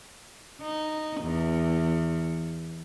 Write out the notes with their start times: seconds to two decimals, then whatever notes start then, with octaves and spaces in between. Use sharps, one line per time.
0.61 D#4
1.21 E2